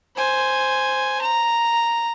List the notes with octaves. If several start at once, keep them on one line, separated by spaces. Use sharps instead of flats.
C5 G#5
A#5